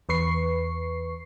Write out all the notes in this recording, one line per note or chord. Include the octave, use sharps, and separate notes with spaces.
E2 B4 C#6 C7